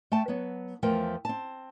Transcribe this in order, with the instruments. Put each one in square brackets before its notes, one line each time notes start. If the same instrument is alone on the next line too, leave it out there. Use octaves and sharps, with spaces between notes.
[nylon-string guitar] A3 G5 A5
F#3 B3
E2 F3 A3 A#4 G5
C4 A5